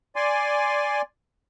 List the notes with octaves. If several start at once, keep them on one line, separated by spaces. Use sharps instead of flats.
D5 G#5 C6